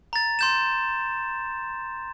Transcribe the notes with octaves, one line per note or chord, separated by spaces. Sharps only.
A#5 A6
C6 G6 E7